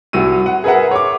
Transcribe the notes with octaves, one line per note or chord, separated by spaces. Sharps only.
C2 F#4 E6 D#7
F#5
G#4 A#4 B4 E5 F#5
C#5 D6